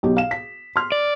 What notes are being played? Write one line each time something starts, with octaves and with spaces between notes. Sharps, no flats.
B1 G4
F5 E7
B6
C6 F6
D5